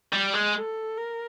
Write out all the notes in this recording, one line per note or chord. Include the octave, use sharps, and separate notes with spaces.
G3
G#3
A4
A#4